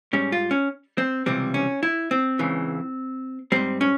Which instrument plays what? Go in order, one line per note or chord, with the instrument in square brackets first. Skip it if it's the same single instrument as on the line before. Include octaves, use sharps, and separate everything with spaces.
[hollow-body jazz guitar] G#2 G3 C#4
F4
C#4
C4
C#2 C3 E3 G3 C4
C#4
E4
C4
C#2 C#3 E3
G#2 G3 C4
C#4